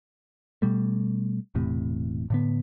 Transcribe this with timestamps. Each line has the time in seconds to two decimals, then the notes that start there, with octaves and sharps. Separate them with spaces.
0.62 B2 G3 A3
1.55 E1 E2 A2 C3
2.30 A2 D3 B3